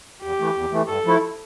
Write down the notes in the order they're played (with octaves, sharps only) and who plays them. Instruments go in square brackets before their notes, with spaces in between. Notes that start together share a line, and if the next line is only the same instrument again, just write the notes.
[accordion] E2 [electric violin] G4
[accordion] E3 A3
E2
E3 A3
[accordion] G2 [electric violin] A4
[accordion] F3 A3 E4